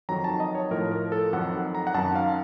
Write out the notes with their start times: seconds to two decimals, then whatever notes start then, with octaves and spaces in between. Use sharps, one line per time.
0.09 F2 D#3 F#3 A#5
0.24 A5
0.40 D#5
0.55 C#5
0.71 A2 F3 A#4
0.91 A#4
1.12 A4
1.33 F2 D#3 F#3 F#5
1.75 A#5
1.87 F#5
1.94 F#2 D#3 F#3 A5
2.15 F5